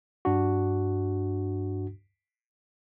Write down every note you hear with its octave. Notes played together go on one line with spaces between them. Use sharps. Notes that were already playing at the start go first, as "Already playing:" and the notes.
G2 D4 F#4